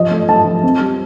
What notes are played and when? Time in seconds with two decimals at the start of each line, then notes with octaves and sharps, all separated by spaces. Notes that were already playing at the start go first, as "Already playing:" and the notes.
Already playing: F3 D#5
0.11 A3
0.28 A3 A5
0.45 F3
0.63 C4
0.80 G3